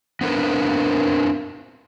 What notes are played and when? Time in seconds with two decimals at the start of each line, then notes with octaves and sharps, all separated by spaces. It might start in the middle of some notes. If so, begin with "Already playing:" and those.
0.21 B3 C4 D4 A#4 B4